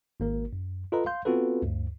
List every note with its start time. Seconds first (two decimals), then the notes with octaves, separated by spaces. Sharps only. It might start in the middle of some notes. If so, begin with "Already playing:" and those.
0.20 G#1 A#3 A#4
0.53 F#2
0.92 F4 A4 B4 D#5 A#5
1.06 F5 C6 G6
1.25 B3 C4 F4 F#4 A4 B4
1.62 D2 G2